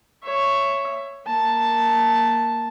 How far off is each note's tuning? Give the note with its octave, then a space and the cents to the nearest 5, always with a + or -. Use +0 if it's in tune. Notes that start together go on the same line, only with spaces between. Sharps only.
C#5 +0 E5 +15
A#3 +0 A5 +0